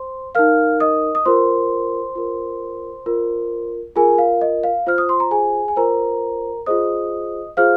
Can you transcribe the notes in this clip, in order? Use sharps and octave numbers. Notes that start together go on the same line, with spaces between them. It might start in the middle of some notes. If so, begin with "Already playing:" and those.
Already playing: C5 C6
D#4 A#4 F5 F6
D#5 D#6
D#6
F4 A#4 C5 C6
F4 A#4
F4 A#4
F4 G#4 A#4 G#5
F5
D#5
F5
F4 C5 F6
D#6
C6
A#5
G#4 G#5
G#5
F4 A#4 C5 A#5
F4 G#4 C5 D#5 D#6
F4 G#4 C5 F5 F6